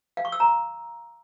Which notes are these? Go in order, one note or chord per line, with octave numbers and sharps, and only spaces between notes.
F5
C#6
E6
A#5